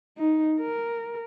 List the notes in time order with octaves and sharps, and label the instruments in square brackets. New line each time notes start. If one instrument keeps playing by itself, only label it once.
[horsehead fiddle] D#4
A#4